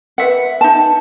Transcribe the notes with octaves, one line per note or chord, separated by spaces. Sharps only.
B4 E5 F#5
D#4 A5